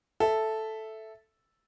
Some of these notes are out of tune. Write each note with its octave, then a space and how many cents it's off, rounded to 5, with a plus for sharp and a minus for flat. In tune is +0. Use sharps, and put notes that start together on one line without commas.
A4 -5 E5 +0